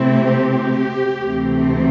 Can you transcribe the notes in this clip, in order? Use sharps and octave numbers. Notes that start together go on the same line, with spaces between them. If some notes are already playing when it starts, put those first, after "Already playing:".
Already playing: C3 A3 C4 E4
G4
D2 C3 E3 A3 C4